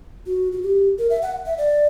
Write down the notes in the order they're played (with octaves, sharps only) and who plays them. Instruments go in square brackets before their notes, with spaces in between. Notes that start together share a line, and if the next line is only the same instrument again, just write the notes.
[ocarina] F#4
F#4
G4
A#4
E5
F#5
E5
D5